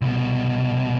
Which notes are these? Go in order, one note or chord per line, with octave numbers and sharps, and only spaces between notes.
C2 B2